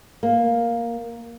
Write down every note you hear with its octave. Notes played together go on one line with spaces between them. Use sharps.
A#3